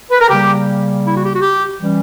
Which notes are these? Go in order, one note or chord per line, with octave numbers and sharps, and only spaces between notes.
B4
A#4
C#3 G3 A#3 G4
E4
F#4
G4
F#4
G4
E3 G3 C#4